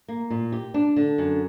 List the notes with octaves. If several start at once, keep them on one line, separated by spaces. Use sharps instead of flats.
A#3
A#2
G4
D4
D3
F#2